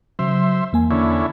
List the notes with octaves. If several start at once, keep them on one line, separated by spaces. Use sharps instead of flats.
C#3 F#3 C5 E5
E2 A#3 G#5
D3 C#4 E4